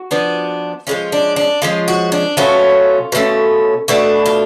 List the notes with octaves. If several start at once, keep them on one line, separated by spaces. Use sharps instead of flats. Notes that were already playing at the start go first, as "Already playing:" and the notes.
Already playing: F#4
F3 B3 D4
F3 G#3 C#4 F4
D4
D4
F3 G#3 C#4 F4
F#4
D4
B2 F#3 A3 C#4 F4
B2 F#3 A3 C#4
B2 A3 D4 F#4
F4